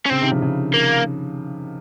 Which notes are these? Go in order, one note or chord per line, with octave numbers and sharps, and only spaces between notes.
C#4
C#3 C4
C3 D#3
C#3 F3
C#3
A#3